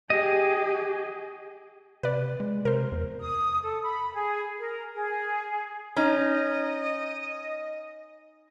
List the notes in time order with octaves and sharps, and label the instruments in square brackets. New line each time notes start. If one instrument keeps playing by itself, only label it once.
[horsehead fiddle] G4 G#4 [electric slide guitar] D#5
[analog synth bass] C3 [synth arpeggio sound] B4 D5
[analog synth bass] G#3
[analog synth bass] C3 [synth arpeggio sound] A#4 C5
[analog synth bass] E2
[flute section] D#6
A4
B5
G#4
A#4
G#4
[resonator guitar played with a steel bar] C#4 D#4 [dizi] D#5